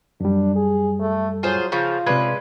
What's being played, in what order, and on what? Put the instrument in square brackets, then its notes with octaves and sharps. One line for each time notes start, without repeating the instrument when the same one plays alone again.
[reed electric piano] F#2 G3 [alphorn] D4
[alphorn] G#4
A3
[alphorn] F#3 [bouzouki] F4 G#4 C5
[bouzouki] C#3 F3 [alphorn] F4
[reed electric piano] C3 D5 G#6 [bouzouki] G#3 C#4 B4